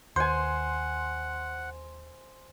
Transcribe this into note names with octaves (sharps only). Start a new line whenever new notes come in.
D#2 C5 F#5 G#5 C6